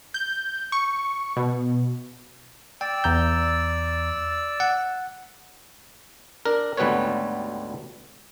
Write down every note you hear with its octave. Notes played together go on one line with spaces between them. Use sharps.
G6
C#6
B2
D5 G5 E6
E2 A#5 G6
F#5
D4 A#4
G#1 D2 G3 B3 B4 C#5